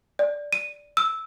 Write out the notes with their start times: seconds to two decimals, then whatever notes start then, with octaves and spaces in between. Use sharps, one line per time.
0.19 D5
0.53 D#7
0.97 E6